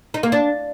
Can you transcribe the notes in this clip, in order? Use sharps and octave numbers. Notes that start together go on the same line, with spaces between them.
D#4
A#3
D4